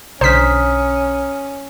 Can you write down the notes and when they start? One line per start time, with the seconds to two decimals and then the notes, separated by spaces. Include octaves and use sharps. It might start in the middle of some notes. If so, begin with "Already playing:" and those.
0.21 B1 D3 C#4 C5 A#5 D#6 F6 B6